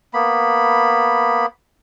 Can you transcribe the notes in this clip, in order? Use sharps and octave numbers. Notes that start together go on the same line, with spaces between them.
A#3 B3 B5